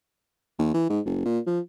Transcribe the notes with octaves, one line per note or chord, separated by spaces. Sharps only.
D#2
E3
G#2
F#1
A#2
F3